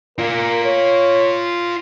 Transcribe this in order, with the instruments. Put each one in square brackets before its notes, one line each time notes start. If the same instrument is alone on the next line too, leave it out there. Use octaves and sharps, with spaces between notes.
[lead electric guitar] F4 D5 [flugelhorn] A#4
[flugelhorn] C#5